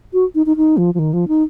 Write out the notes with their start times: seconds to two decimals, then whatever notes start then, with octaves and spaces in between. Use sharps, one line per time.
0.13 F#4
0.35 D#4
0.46 D#4
0.57 D#4
0.77 F3
0.94 F3
0.99 D#3
1.13 F3
1.28 D#4